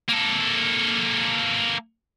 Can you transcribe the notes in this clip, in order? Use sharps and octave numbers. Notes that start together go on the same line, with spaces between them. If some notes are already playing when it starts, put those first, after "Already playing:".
A#3 A4